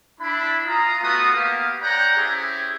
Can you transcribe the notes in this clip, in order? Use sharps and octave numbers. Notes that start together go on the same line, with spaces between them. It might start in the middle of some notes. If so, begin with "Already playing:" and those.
D4 E4 B5
F4 A#5 D#6
A3 B3 F4 F#4 D#6
A#3 B3 G4 F5
G4 C#5 D5 F#5 G5 A#5
C4 C#4 E4 G4 G#4